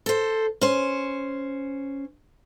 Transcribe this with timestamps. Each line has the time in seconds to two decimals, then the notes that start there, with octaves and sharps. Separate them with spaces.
0.06 A4 C5
0.61 C#4 C5